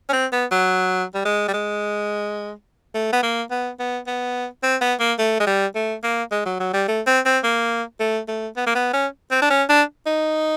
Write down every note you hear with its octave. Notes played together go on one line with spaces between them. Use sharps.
C#4
C4
B3
F#3
G3
G#3
G3
G#3
A3
B3
A#3
B3
B3
B3
C4
B3
A#3
A3
G#3
G3
A3
A#3
G#3
F#3
F#3
G3
A3
C4
C4
A#3
A3
A3
B3
A#3
B3
C#4
C4
D4
C#4
D4
D#4